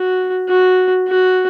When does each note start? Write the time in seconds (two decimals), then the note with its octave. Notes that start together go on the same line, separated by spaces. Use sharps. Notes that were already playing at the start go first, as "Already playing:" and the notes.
Already playing: F#4
0.49 F#4
1.07 F#4